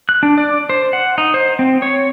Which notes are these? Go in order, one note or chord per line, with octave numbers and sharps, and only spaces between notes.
F#6
D4
D5
C5
F#5
D#4
C5
C4
C#5